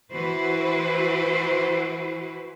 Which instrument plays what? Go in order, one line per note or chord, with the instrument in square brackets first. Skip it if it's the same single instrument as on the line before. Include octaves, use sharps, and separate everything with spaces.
[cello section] E3 E4 F#4 B4 C5